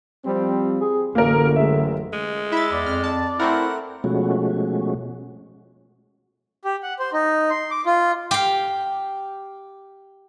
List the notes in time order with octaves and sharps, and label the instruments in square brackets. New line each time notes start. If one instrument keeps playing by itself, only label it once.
[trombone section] F3 G3 C4
[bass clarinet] G#4
[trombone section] A1 F#2 [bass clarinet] D3 [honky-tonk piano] A#3 A#4
[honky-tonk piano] G#3 E5
[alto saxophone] G#3
[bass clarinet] E4 [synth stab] E5 A6 [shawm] B5
[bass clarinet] E2 [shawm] D5
[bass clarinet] F2 [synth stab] F6
[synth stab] A5
[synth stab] A3 C4 A#4 [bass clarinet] E4 [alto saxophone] F#5
[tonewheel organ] B2 F3 G#3 A3 C#4 F#4
[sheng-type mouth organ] G4
F#5
C5
D#4
C6
D6
F4
[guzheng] G4 F5